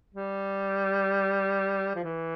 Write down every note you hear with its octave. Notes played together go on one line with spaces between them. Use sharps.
G3
F3
E3